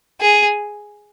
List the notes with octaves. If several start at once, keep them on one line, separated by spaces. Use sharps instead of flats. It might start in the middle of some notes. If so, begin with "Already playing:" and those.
G#4